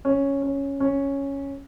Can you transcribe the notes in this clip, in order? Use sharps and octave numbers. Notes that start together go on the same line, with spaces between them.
C#4
C#4
C#4